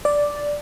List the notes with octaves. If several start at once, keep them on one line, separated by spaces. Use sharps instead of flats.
D5